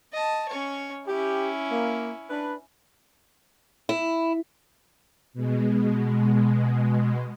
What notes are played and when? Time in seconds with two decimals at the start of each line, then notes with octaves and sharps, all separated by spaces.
0.13 D#5 A5
0.49 C#4 C#5
1.07 C#4 E4 G4
1.71 A#3
2.30 D4 B4
3.89 E4
5.34 B2 G#3